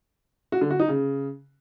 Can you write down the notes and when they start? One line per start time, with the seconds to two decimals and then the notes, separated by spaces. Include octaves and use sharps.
0.52 F#4
0.61 D3
0.70 F#4
0.79 D#4
0.89 C#3